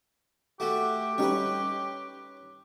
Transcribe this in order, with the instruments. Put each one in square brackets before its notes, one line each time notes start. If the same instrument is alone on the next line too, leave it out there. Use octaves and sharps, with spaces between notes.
[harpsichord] A3 F#4 [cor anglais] G4
[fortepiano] G3 C#4 D#4 [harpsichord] B4 C#5